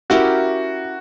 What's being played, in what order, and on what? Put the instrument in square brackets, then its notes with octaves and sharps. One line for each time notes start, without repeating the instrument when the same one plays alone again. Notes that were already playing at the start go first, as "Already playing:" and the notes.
[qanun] C#4 E4 G4 A#4 [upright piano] F#4